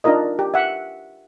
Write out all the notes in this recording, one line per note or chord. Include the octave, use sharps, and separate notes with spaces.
D4 D#4 F4 A#4 D#5
G4
E5 F#5